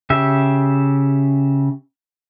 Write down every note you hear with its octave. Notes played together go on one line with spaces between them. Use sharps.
C#3 G4 E5